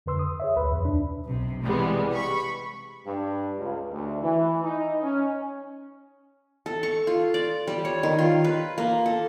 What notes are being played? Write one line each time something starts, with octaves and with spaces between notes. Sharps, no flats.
F2 D3 B4 C6 E6
D#6
G#4 C#5 E5
D2 B4 B5
F2
D#2 C3 D4
B1 C3
C3 E3 G3 G#3 B3
B5 C#6
G2
C#2
D2
E3
D#4
C#4
A4
C#6
F4
D5
G3
C#5
D#3
F4
B4
A#3
A4